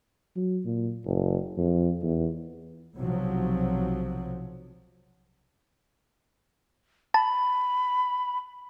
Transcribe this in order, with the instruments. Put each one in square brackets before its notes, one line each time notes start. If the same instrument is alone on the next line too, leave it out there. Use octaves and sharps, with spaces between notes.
[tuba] F#3
A#2
F#1
F2
E2
[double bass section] B1 C3 F3 F#3
[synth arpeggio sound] A5 [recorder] B5